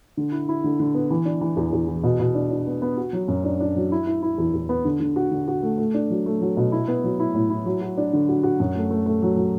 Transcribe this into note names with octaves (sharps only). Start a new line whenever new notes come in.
D3
E4
E4
D3
D3
B3
E3
D4
E3
E2
E2
E3
B2
B2
D4
D4
B3
B3
F#4
F#3
F#2
D4
D4
F#3
E4
E4
E4
E2
E2
B3
D3
D3
F#4
D3
F#4
A3
A3
D4
F#3
A3
F#3
B2
E4
B3
F#3
E4
A2
E4
F#3
F#4
D4
D3
F#4
F#4
F#2
A3
A3
A3
F#3
F#3